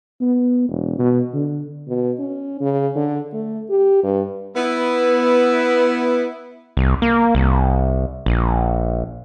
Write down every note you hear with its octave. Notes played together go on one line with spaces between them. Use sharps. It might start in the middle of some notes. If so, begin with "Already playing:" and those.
B3
E1
B2
D3
B2
C#4
C#3
D3
A3
G4
G2
B3 E4
C2
A#3
C2
A#1